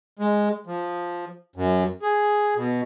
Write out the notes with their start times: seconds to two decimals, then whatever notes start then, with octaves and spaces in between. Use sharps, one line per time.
0.19 G#3
0.67 F3
1.56 F#2
2.02 G#4
2.56 B2